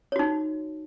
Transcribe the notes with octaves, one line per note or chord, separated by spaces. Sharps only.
D#4 F#4 C#5